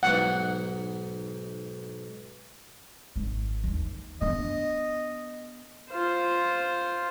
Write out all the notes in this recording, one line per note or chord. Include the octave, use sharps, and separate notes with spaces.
B1 G#2 F#5
G#1
D#2
B3 D4 D#5
F4 C5